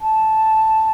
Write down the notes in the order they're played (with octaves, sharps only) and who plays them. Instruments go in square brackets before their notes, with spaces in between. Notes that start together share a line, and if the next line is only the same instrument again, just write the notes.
[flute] A5